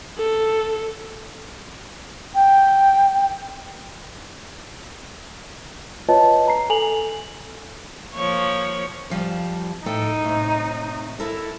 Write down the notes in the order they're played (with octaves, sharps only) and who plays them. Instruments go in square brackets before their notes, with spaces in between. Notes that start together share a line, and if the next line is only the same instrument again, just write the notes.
[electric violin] A4
[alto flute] G5
[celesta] F4 B4 C#5 D#5 A5
A#5 C7
A4 G#5 F7 F#7
[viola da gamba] F3 A#3 C#5
[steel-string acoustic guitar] F2 F3 G3
[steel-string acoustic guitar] A2 A4 G5 [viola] D#4
[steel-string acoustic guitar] A2 C3
E4 A4 A#4